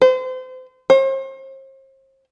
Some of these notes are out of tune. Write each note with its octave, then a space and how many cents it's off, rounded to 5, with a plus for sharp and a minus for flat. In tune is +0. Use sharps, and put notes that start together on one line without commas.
C5 -35
C5 +40